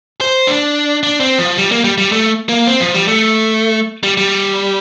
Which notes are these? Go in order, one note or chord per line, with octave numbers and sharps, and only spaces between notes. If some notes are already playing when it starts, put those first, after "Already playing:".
C5
D4
D4
C4
F3
G3
A#3
G3
G3
A3
A#3
C4
F3
G3
A3
G3
G3